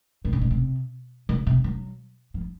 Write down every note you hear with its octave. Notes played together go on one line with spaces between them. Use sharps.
C3
C#3
B2
C3
C#3
C3
F#3
F3